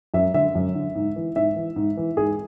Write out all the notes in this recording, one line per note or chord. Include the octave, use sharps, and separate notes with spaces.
F#2 E5
D3 E5
F#2
D3
G#2
E3
G#2 E5
E3
G#2
E3
G#2 G#4